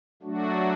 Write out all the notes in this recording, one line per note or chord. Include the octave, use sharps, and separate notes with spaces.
F#3 A3 D4 F#4